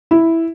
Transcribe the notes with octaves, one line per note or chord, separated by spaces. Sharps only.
E4